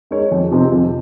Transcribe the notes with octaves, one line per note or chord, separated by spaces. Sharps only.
G#3 D#4 A#4 C#5
F2
C3 F3 C4 D#4
F2